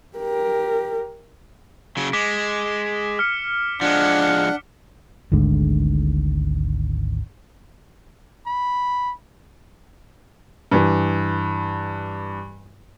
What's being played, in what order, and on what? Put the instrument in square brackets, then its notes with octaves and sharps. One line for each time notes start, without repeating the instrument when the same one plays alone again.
[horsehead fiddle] G4 A#4
[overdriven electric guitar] C#3 F#3 [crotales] D7
[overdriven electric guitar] G#3 [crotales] D6 B6
[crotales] F6 C#7
[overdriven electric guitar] F3 G#3 [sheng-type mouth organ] D4 F#5
[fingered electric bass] G#1 D2 G#2 D3
[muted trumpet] B5
[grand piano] G2 E3